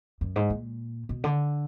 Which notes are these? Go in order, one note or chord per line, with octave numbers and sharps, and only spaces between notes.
F#2
G#2
A#2
B2
D3